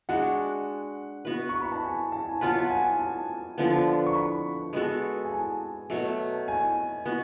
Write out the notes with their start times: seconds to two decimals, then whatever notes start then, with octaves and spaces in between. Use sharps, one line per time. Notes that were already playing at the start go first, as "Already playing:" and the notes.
0.09 G#3 D4 F#4 F#5
1.25 B3 F#4 B4
1.49 C#6
1.61 B5
1.72 A5
1.83 G#5
2.12 A5
2.29 G#5
2.41 F#3 B3 F4 B4 A5
2.61 F#5
2.71 G#5
2.99 A5
3.58 D3 F3 B3
4.06 C#6
4.15 B5
4.73 G#3 B3 F#4 A4
5.25 G#5
5.32 A5
5.90 B2 F#3 A3
6.48 G#5
7.06 B3 F#4